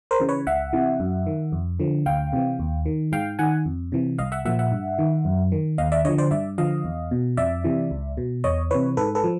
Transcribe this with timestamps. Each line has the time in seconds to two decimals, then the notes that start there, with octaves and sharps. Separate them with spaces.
0.11 A#4 C5
0.20 C#3 E3
0.29 B4 C#5
0.47 C#2 E5 F#5
0.73 C3 E3
1.00 F#2
1.26 D#3
1.52 F2
1.80 D3 F3
2.06 D2 F5 G5
2.33 C3 E3
2.59 D#2
2.86 D#3
3.12 G#2 F5 G5
3.39 D#3 F#5 G#5
3.66 F2
3.92 C3 E3
4.18 C2 D#5 F5
4.32 E5 F#5
4.45 A#2 F3 E5 F#5
4.59 E5 F#5
4.72 G2
4.99 D#3
5.25 F#2
5.52 D#3
5.78 D#2 D#5 F5
5.92 D5 E5
6.05 D3 F3 C#5 D#5
6.18 C5 D5
6.31 G2 D5 E5
6.58 D3 F3 D#5 F5
6.85 E2
7.11 B2
7.37 F2 D5 E5
7.64 C3 E3
7.91 C#2
8.17 B2
8.44 E2 C#5 D#5
8.71 C3 E3 B4 C#5
8.97 G#2 A4 B4
9.15 A4 B4
9.24 F3